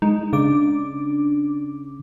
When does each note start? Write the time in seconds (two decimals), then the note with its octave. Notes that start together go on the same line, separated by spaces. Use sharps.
0.02 G#3 D#4
0.33 C#3 D4 D6